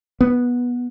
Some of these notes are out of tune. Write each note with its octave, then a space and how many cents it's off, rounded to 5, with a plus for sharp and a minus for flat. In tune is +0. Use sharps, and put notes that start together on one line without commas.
B3 -15